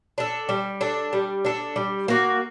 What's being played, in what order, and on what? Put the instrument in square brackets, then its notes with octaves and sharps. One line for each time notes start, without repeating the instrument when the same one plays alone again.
[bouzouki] D4 A4
G3
D4 A4
G3
D4 A4
G3
A#3 F#4